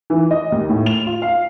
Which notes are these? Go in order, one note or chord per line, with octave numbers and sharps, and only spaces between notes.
E3
D#5
D#2
A2
F7
F4
F5